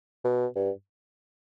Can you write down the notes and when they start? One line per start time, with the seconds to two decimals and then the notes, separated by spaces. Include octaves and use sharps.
0.24 B2
0.56 G2